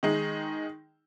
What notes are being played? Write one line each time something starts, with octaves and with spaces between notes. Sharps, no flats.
D#3 G#3 D#4